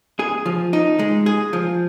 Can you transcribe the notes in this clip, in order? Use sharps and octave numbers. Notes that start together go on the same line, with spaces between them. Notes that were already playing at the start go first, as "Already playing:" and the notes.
G#4
F3
D#4
G#3
G#4
F3